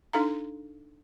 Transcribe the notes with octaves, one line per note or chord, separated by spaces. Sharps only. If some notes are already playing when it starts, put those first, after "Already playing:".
D4 D#4 A4 F5 A#5